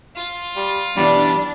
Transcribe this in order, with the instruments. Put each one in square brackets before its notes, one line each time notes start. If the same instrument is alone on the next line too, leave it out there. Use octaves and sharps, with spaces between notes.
[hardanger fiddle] F4
[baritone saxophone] G3
[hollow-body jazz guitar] F#2 B2 E3 [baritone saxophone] G3 [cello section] D4